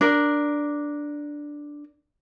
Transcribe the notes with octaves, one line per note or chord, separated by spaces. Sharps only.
D4 A#4